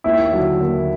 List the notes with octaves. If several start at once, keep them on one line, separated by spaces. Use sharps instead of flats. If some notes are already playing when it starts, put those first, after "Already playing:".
D#2 E4
D3 F#3
D#2